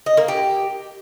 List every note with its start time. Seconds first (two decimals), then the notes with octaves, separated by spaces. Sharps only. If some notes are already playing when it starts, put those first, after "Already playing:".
0.06 D#5
0.17 A#3
0.28 G4